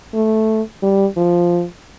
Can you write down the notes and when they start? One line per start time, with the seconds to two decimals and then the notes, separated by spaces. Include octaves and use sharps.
0.14 A3
0.83 G3
1.17 F3